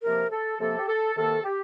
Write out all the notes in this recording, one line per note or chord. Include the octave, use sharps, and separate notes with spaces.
C3 F3 A#3 A#4
A4
C3 F3 A#3 A4
G4
A4
C3 D#3 A#3 A4
G4